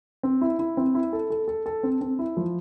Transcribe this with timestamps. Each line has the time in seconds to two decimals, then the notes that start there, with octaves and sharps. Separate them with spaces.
0.23 C4
0.41 E4
0.59 E4
0.77 C4
0.95 E4
1.13 A4
1.30 A4
1.48 A4
1.66 A4
1.83 C4
2.01 C4
2.19 E4
2.37 F3